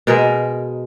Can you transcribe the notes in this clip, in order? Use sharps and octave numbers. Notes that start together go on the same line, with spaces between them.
B2 G#3 A#4